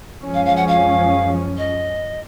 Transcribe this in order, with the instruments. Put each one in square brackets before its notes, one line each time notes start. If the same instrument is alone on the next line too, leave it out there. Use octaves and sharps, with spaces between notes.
[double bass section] F#2 F3 G#3 C#4
[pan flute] F5
F5
F#5
F5
D#5